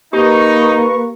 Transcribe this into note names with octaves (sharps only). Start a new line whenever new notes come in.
A#3 D#4 G4 B4 A#5 C#6